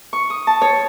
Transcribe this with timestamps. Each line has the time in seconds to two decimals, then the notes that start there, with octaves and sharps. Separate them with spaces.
0.13 C#6
0.30 D#6
0.47 A5
0.61 C#5